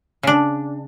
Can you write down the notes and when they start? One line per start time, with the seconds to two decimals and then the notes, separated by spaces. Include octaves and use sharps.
0.23 C#3 D4